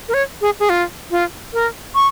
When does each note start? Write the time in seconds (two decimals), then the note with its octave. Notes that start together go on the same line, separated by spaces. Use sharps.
0.09 A#4
0.14 C#5
0.41 G#4
0.60 G#4
0.69 F4
1.11 F4
1.53 A#4
1.95 C#6